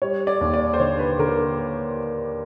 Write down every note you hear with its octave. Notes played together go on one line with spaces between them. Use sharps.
G3 C#5
D5
D#2
D5
C5
D3 C#5
B4
D3 A#4